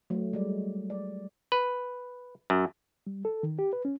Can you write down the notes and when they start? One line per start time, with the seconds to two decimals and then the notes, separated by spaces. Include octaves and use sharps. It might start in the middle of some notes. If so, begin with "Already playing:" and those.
0.10 F#3 A3
0.33 G3 G#3 D5
0.90 D5
1.52 B4
2.50 F#2
3.07 G3
3.25 A4
3.43 D#3
3.59 G4
3.73 B4
3.85 C#4